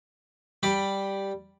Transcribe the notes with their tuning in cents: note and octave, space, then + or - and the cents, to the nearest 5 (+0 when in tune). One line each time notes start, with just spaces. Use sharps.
G3 +0 B5 +0